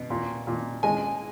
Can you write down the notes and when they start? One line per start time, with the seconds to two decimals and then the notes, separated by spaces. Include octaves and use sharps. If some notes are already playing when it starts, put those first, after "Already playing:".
Already playing: B2
0.10 A#2
0.47 A#2
0.83 G#3 G#5